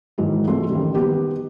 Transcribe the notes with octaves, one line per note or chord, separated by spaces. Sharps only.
G#2 D#3 E3 F#3 G#3 E4
C2 E3 F3 G#3 A3 C6
A1 D#3 G3
D#3 B3 G4